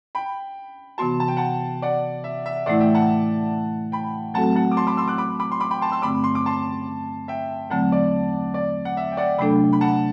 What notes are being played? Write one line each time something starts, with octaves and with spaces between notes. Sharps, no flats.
G5 B5
C3 E3 B3 F#4 A5 C6
A5
G5
F#5 A5
D5 F#5
E5
E5
A2 E3 A3 E4 D5 F#5
E5 G5
F#5 A5
G5 B5
F#3 A3 C4 F#4 A4 F#5 A5
F#5 A5
D6
A5 C6
B5 D6
C6 E6
D6 F#6
B5 D6
B5 D6
C6
B5 D6
G5 B5
A5 C6
C6 E6
G2 D3 A3 C4 B5 D6
C6
D6
A5 C6
E5 G5
E2 D3 F#3 A3 C4 F#5 A5
D5
D5
F#5
E5
G5
D5 F#5
C3 F#3 A3 D4 A4 G5 B5
B5
F#5 A5